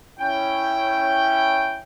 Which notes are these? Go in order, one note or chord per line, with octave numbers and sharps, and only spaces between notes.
C#4 E4 G5